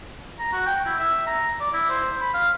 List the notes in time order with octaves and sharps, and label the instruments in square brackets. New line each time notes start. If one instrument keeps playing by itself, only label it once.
[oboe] A#5
F#4
G5
E4
E5
A#5
D5
E4
C5
B5
F5